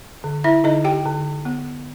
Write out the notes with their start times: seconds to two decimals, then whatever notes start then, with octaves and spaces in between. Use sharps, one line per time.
0.24 D3
0.44 E4 E5
0.64 D3 D#4 D#5
0.84 G4 G5
1.05 D3
1.45 B3